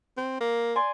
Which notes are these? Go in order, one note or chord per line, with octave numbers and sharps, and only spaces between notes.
C4
A#3
D5 G#5 C6